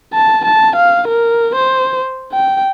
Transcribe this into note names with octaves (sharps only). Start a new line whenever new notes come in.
A5
A5
F5
A#4
C5
G5